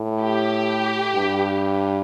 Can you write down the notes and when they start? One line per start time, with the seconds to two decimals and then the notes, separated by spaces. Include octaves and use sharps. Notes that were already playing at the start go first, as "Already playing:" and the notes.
Already playing: A2
0.21 G4
1.15 G2